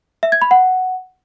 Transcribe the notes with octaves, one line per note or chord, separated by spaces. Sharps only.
E5
G#6
B5
F#5